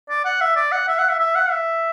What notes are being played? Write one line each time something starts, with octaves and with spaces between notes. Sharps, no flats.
D5
F#5
E5
D5
F#5
E5
F#5
E5
E5
F#5
E5